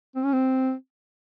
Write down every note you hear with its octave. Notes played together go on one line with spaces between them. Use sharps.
C4
C#4
C4